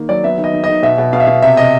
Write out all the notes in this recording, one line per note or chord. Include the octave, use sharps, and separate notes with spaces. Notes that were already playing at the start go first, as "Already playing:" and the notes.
Already playing: D#3 A#3
F#3 D5
B3 E5
D#3
D#5
D#3
D#3 D#5
B2 E5
B2
B2 F5
E5
B2 F5
C3 E5
C3 D#5